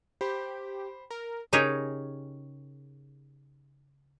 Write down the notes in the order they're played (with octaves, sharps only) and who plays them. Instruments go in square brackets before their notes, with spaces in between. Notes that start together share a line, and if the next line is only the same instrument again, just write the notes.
[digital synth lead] G4 [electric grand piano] C5 B5
[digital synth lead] A#4
[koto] C#3 D#4 G4 G#4 A#4 C#5